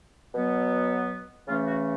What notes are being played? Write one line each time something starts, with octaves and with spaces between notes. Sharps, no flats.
B2 F#3 B3
C#3 E3 A3 C#4 F4
F#4